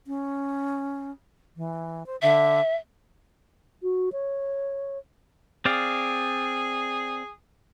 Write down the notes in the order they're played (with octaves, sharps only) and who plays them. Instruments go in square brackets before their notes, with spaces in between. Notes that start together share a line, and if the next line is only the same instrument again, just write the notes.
[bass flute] C#4
E3
C5
[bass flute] D3 [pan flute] E5
[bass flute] F#4
C#5
[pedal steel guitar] C4 D5 F5 [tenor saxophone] G#4